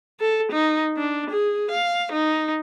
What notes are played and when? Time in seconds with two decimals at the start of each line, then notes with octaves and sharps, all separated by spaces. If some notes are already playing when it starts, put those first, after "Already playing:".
0.21 A4
0.52 D#4
0.97 D4
1.30 G#4
1.71 F5
2.12 D#4